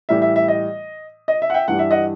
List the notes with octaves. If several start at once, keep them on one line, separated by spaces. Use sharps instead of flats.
A2 E3 G3 E5
E5
E5
D#5
D#5
E5
F#5
E5 G5
G2 E3 G3 F#5
E5
D#5 F#5